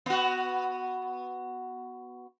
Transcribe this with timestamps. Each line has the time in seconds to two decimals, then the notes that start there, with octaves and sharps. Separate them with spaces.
0.06 B3 F#4